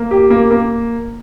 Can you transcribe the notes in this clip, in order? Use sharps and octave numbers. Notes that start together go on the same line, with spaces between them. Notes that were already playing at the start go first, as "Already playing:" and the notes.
Already playing: A#3
G4
A#3
A#3